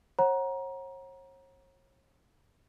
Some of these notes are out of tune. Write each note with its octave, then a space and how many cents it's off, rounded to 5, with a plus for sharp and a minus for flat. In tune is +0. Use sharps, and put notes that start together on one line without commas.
C#5 -40 F#5 +0 A#5 +20